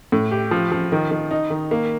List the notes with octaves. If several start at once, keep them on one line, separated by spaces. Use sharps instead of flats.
A2
G4
F3
F3
D#3
D#3
D#4
D#3
A#3